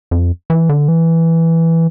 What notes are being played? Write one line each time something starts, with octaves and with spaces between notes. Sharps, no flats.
F2
E3
D3
E3